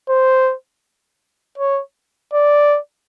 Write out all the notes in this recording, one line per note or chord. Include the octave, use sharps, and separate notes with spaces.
C5
C#5
D5